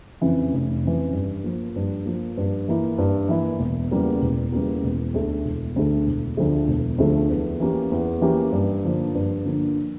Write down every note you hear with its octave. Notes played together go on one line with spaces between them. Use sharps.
F2 C#3 E3
F1
F2 C#3 E3
G2
F3 A#3
G2
F3 A#3
G2
E3 A#3 E4
G2
E3 A#3 E4
E1
E2 C#3 G3 A#3
E1
E2 C#3 G3 A#3
E1
D2 D3 A3
E1
D2 D3 A3
E1
D2 D3 F3 A3
E1
D2 D3 F3 A3
E2
E3 A#3 C#4 G4
E2
E3 A#3 C#4 G4
G2
D3 F3 A#3 D4
G2
D3 F3 A#3 D4